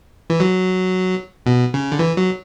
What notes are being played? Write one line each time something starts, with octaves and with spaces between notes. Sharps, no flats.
E3
F#3
B2
C#3
D3
E3
F#3